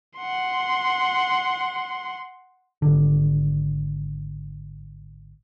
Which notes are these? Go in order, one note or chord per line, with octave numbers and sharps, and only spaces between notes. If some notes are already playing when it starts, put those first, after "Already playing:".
F#5 C6
G#1 D3